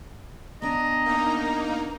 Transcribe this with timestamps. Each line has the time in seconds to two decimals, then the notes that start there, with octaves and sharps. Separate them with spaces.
0.62 B3 D4 D#5 G#5 A#5
1.06 A#3 D#4